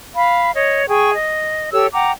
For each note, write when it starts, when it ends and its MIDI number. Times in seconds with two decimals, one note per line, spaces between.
0.15 0.52 77
0.15 0.52 83
0.55 0.84 73
0.55 0.84 75
0.87 1.11 68
0.87 1.11 79
0.87 1.11 85
1.14 1.70 75
1.72 1.87 67
1.72 1.87 69
1.72 1.87 73
1.72 1.87 88
1.93 2.12 78
1.93 2.12 79
1.93 2.12 82
1.93 2.12 86